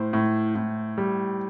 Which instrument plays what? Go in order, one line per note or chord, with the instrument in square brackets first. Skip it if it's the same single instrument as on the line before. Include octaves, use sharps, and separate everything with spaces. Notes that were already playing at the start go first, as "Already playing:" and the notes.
Already playing: [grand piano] A2 C5
A2
A2
G3